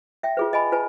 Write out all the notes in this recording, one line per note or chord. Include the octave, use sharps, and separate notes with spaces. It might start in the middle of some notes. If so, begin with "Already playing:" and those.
E5 G5
F4 G#4 B4
D#5 G#5 B5
F4 B4 G#5 A5